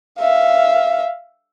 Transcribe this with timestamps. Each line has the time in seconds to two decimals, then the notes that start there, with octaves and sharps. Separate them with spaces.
0.19 E5 F5